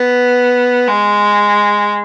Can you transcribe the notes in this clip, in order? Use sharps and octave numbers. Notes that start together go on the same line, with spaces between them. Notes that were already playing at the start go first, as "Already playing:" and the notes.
Already playing: B3
G#3